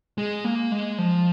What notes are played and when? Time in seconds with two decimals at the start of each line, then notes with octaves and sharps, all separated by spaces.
0.18 G#3
0.45 A#3
0.72 G#3
0.98 F3